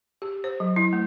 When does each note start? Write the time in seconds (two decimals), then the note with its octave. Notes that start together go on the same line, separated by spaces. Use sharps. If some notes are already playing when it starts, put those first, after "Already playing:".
0.22 G4
0.44 C5
0.60 F#3
0.76 E4
0.93 A3